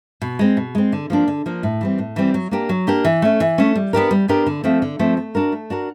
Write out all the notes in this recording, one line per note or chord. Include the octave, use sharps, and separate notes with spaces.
B2
G#3 C4
B2
G#3 C4
D3
F3 A#3 D4
D3
F3 A#3 D4
A2
E3 G3 C4
A2
E3 G3 C4
F#3
A#3 D4 G4 A#4
F#3
A#3 D4 G4 A#4
E3
A3 C#4
E3
A3 C#4
G3
B3 D4 G4 A#4
G3
B3 D4 G4 A#4
D3
F3 A3 C4
D3
F3 A3 C4
A3
D4 F#4 A#4
A3
D4 F#4 A#4